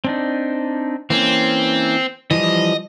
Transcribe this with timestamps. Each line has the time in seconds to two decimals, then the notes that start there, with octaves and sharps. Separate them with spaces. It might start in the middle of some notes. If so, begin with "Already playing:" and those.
0.04 C4 D4 D#4
1.10 E3 A#3 C4 C#4
2.31 E3 F3 G3 D#5